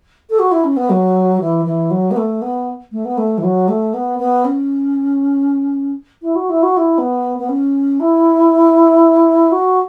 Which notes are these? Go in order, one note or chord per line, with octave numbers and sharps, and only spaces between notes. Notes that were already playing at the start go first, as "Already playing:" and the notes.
A4
F#4
E4
C#4
B3
F#3
E3
E3
F#3
B3
A3
B3
A3
B3
A3
E3
F#3
A3
B3
B3
C#4
E4
F#4
E4
F#4
E4
B3
B3
C#4
E4
F#4